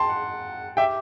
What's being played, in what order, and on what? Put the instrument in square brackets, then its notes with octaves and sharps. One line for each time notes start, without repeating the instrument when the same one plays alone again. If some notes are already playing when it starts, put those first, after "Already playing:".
Already playing: [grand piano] G5 A5 C6
[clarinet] F#5
[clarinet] G4 [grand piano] E5 G5